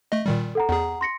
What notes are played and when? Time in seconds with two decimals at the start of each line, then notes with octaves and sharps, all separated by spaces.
0.12 A3 D#5
0.26 A#2 D#3 G3
0.55 A4 F#5 A#5
0.69 E2 G#4 F#5 A#5
1.01 C6 A#6 C#7